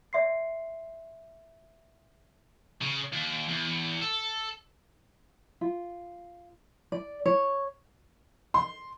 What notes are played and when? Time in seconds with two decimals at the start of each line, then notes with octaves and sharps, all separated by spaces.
0.13 D5 E5 C6 C7
2.82 C#3
3.12 D#2
3.48 E2
4.01 A4
5.61 F4
6.92 D5
7.26 C#5
8.54 C6